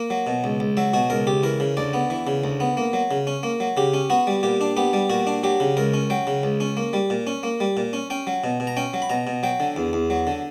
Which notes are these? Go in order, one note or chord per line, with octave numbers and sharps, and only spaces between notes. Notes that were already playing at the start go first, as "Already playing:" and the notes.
Already playing: A#3
F#3
B2
C#2
C#2
F#3 E5
B2 F#4
C#2 A#4
C#2 G4
E3 A#4
C#3
D2 D5
B3
E3
C#3
D2
B3
A#3
F#3
C#3
C#4
A#3
F#3
C#3 G4
C#4
B3 F#4
G3
A#2 G4
D4
B3 G4
G3
A#2 F#4
D4
F#3 G4
C#3
C#2 A#4
C#4
F#3 G5
C#3
C#2
C#4
A#3
G3
A#2
C#4
A#3
G3
A#2
C#4
C#4 G5
F#3
B2
B2
A#5
C#4 G5
F#3
B5
B2 A#5
B2
F#3 G5
D3
E2
E2
F#3
D3